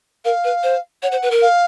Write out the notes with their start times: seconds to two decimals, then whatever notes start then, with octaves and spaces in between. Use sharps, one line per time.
0.24 A#4 F5
0.44 B4
0.63 C5
1.02 C#5 F#5
1.12 C5
1.22 B4
1.31 A#4
1.41 F5